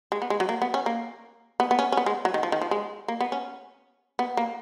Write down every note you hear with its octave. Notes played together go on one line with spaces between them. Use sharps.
G#3
B3
G#3
F#3
A#3
B3
C#4
A#3
B3
B3
C#4
C#4
B3
G#3
F#3
D#3
F3
D#3
F3
G#3
A#3
B3
C#4
B3
A#3